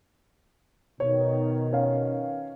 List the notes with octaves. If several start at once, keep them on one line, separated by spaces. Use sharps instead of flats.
B2 D#3 C#5
C#4 F5